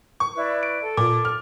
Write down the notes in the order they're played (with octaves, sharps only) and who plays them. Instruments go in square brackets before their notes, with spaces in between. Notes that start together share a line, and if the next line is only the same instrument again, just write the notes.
[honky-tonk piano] C#6
[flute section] E4 B4 D5
[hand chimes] D7
[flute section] A4
[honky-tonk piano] A#2 [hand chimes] D6
[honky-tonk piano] F6